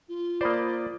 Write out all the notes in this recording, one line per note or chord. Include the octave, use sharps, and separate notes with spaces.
F4
A#3 C5 D5 B5 D#6